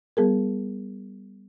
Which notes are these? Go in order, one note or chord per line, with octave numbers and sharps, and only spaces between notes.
G3 B3 G#4 A#4